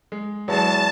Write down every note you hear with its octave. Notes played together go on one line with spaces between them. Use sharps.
G#3
E2 F#3 G#3 A5